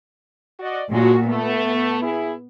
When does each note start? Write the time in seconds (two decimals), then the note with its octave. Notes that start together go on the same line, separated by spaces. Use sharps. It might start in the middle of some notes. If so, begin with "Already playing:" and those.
0.60 F#4 D5 D#5
0.90 G2 A#2 F#3 G#3 F#4
1.28 A3 B3
2.02 E4 G#4